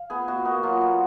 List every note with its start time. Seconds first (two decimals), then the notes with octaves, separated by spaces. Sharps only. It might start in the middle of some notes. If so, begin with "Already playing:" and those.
Already playing: F5
0.10 B3 G#4
0.28 B2 F#4
0.45 A#3 F#4
0.63 F#3 F4
0.81 B2